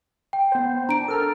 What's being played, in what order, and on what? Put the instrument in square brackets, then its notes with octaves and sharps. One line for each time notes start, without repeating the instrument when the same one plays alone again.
[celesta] G5
[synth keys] B3 C5
[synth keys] D4 [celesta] A#5 D7
[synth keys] A4 A#4 F6